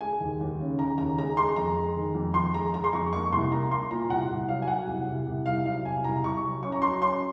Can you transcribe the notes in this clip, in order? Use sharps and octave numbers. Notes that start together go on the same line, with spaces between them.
G#3 G#5
D#2
D#2
C#3
C#3 A#5
D#2 A#5
G#3 A#5
G#3 C6
F2 A#5
G#3
D#3
F2
F2 C6
G#3 A#5
G#3 A#5
C6
F2 C#6
A#3 C#6
C2 C6
A#3 A#5
A#3 C6
A#2 A#5
C2 F#5
C2
F#3 F5
G#5
F#3 F#5
C2
C2
C2
C2 F5
F#3 F5
C2 G#5
C2 A#5
C2 C#6
F#3
C#4 C#6
A#5
F#3 C6
C#4 C6